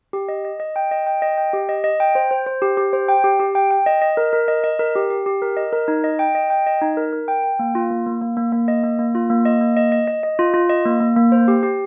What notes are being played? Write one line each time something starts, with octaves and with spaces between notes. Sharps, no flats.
G4
D#5
D#5
D#5
G5
D#5
G5
D#5
G5
G4
D#5
D#5
G5
C5
C5
C5
G4
G4
C5
G5
G4
G4
G5
G5
D#5
D#5
A#4
A#4
D#5
D#5
A#4
G4
G4
G4
A#4
D#5
A#4
D#4
D#5
G5
D#5
G5
D#5
D#4
A#4
A#4
G5
G5
A#3
F4
A#3
A#3
A#3
A#3
A#3
D#5
A#3
A#3
F4
A#3
D#5
A#3
D#5
D#5
D#5
D#5
F4
F4
D#5
A#3
A#3
A#3
C5
G4
G4